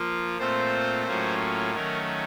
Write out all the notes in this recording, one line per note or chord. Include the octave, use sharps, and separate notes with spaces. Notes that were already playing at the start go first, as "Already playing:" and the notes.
Already playing: F3 A#3 F4
A#2 A3 C4 F4 C5
A2 F#3 A#3 C#4 F4
D#3 F#3 A3 C#4 A#4